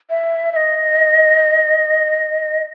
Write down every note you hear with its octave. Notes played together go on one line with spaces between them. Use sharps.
E5
E5
D#5